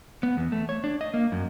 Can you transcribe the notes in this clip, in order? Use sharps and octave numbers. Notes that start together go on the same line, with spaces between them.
B3
E2
A3
C#5
D4
D#5
A#3
F#2